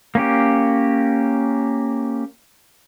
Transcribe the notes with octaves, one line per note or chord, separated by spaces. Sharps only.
A#3 C#4 G4